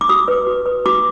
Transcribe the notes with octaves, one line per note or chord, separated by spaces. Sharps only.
D6
F#4 D#6
B4
F#4
B4
F#4 D6